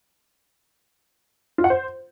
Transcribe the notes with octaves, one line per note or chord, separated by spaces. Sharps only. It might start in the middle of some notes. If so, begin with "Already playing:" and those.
F4
F#5
C5